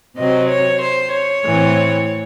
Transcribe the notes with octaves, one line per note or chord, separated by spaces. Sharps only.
C3 F#3 C4 D#5
C#5
C5
C#5
A2 E3 C4